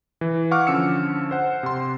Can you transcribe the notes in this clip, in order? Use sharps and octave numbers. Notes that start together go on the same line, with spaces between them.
E3
F5 F#5 C#6 D6 F6
D3 F3 C#4 E6 C#7
C5 F#5
C3 C6